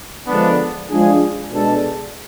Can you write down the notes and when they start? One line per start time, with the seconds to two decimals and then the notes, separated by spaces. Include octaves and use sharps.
0.27 D3 F3 G#3 B3 D4
0.89 F3 G#3 D4 G#4
1.51 B2 G#3 D4 A4